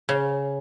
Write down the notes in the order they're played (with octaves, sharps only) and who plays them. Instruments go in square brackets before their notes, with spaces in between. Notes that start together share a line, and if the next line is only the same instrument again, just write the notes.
[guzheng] C#3